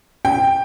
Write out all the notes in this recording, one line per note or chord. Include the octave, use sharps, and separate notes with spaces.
G5